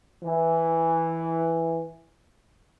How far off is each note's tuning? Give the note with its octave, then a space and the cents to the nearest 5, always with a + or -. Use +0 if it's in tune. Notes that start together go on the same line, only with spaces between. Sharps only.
E3 +0